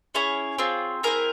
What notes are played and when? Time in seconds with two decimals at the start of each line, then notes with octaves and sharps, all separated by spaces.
0.15 C#4 E4 G#4 C#5
0.59 C4 F4 G#4
1.03 C4 E4 G#4 A#4